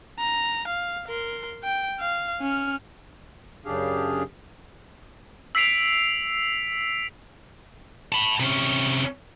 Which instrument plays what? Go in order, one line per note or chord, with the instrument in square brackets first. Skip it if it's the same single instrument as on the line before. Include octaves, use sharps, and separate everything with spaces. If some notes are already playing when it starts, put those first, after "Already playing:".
[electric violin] A#5
F5
A#4 C6
G5
F5
C#4 F6
[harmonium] F#2 C#3 D4 G4 G#4 F5
[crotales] E6 B6 C7 D7 F7
[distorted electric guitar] A5 B5
C3 C#4